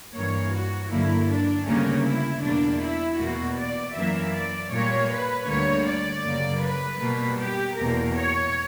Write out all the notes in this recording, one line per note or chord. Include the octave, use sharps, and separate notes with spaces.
G2 E3 A#3 C#5
F#4
G2 D3 F#3 A#3 E4
D4
D2 C#3 G3 A#3 C#4
E4
E2 B2 G3 A#3 D4
E4
E2 B2 A#3 F#4
D5
F#2 E3 A#3 E5
D5
A#2 G3 A#3 C#5
B4
D2 D3 G3 A#3 C#5
D5
F#2 C#3 G3 A#3
B4
B2 G3 A#3
G4
E2 B2 A#3 A#4
C#5